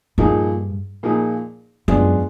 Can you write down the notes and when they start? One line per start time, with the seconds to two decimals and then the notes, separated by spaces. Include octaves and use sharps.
0.18 G2 A#2 F3 A#3 D#4 G#4
1.03 A#2 F3 A#3 D#4 G#4
1.88 F#2 G#3 B3 D4 F4 G#4